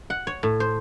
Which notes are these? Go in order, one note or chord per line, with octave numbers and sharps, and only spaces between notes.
F#5
C#5
A2
C5